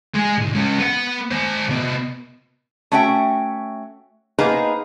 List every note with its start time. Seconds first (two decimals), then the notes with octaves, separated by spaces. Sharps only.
0.14 G#3 G#4
0.38 B1 G#2
0.54 G#3 C#4
0.78 B3 F#5
1.31 D#3 C5
1.69 C3 B3
2.92 A3 C#4 F#4 E5 G5
4.39 A#3 B3 D#4 G#4 B4 C5